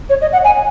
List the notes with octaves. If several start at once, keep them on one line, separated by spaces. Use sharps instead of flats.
C#5
D#5
F#5
G#5